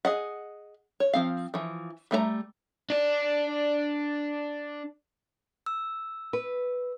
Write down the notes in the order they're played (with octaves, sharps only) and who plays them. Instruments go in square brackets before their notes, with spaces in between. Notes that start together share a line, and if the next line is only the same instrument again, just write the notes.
[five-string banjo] G#4 D#5 F#5
C#5
F3 C4 F5
E3 F3
G3 A3 C5 A#5
[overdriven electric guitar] D4 D5
[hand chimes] E6
[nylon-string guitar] B4